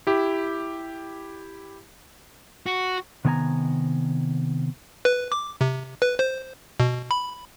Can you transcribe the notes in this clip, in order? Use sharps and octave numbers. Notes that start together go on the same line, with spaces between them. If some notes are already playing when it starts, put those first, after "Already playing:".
E4 G4
F#4
C3 D#3 B3 A#4 G#5 A#5
B4
D6
C3
B4
C5
B2
B5